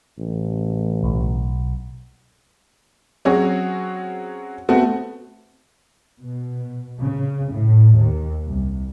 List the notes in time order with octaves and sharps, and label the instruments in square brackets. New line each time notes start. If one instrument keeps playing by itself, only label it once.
[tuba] A1
[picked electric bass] B1
[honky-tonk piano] F#3 C4 C#4 F#4 G#4 C#5
A3 B3 C4 F#4
[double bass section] B2
C#3
A2
D#2
C2